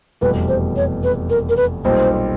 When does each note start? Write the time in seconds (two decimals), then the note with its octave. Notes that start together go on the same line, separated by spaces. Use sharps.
0.21 F1 E2 B2 G3 B4
0.48 C5
0.76 C#5
1.04 B4
1.30 A#4
1.49 A#4
1.57 B4
1.85 B1 A#2 G3 C4 C5